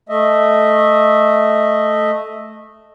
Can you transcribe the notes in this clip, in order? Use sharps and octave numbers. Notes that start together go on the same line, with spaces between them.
A3 D#5 E5